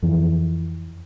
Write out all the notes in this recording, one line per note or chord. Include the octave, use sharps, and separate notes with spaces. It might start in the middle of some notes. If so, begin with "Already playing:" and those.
F2 E3